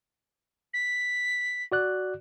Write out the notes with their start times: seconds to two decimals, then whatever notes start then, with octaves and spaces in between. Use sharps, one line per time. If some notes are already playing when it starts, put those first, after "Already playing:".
0.74 B6
1.72 F#4 D5 F#6